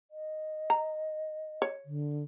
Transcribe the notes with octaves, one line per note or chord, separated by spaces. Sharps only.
D#5
A#5
C#5
D3